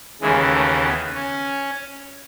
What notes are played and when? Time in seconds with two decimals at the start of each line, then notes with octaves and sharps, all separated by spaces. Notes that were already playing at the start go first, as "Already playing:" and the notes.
0.21 D#2 C#3 E3 G#3
0.53 A3
0.84 B3
1.15 C#4